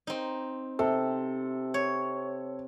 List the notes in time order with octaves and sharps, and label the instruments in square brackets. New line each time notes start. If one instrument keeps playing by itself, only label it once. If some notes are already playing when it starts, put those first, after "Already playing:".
[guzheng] C4 D#4
[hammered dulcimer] C3 [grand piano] A4
[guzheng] C#5